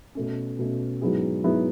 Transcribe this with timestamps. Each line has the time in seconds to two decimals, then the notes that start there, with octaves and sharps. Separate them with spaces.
0.15 B2 A3 C#4
0.59 B2 A3 C#4
1.02 G#2 F#3 B3 E4 G#4
1.44 G#2 F#3 B3 E4 G#4